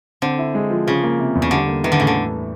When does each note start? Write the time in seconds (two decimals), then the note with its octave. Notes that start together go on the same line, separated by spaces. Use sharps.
0.22 D3 C4
0.39 E4
0.55 G#3
0.71 F3
0.87 C#3 F3
1.03 A#3
1.19 C3
1.35 E2
1.42 C#3
1.51 D3 G3
1.68 A#3
1.84 D#3 E3
1.92 D3
1.99 A2 C#3
2.07 D3